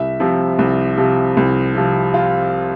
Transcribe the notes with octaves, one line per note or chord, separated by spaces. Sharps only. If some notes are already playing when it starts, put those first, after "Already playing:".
Already playing: C2 E5
C3 F3
C2
C3 F3
C2
C3 F3
F4